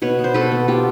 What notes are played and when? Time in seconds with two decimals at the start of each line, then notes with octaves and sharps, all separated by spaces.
0.02 B2 B4 C#5
0.19 B3
0.24 C5
0.34 B2 A4 B4
0.52 B3
0.68 B3 F4 G4